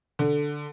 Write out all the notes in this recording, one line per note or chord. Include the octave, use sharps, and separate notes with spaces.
D3